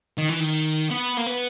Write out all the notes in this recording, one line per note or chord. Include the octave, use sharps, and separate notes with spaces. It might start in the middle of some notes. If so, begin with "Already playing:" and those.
D#3
E3
D#3
B3
A#3
B3